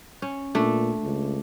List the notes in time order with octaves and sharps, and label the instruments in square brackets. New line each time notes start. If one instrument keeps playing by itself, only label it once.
[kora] C#4
[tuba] A#2 [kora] A3 D4
[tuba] C#2